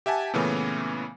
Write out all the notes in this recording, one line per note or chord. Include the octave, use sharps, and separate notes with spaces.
G4 E5 F#5 G#5 A5
A#2 C#3 E3 A3 B3 C#4